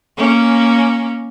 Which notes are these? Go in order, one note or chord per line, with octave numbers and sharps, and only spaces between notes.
A#3 C#4